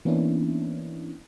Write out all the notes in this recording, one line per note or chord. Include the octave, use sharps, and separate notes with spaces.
E3 A#3 B3 C#4 D4 E4